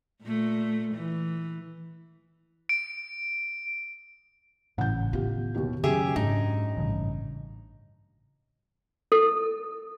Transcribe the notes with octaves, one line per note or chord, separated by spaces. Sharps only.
A#2 A3
E3
D7
G#1 A2 C#3 E3 F#5 G6
D#3 B3 F4 G4
D#2 B2 G4
F#2 C#3 G4 G#4 E5
G#2 D4 D#4
A1 G2 C#3
A4